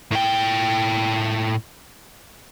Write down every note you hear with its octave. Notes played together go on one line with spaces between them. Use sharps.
A2 G5